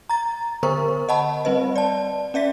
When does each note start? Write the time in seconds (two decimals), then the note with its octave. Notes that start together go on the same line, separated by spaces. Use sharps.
0.09 A#5 A6
0.63 D3 B3 A#4 C5 C#6
1.09 D#5 F#5 A5 B5
1.45 G3 C4 B4 D#5
1.76 D5 A5
2.34 C#4 D5 E5 B6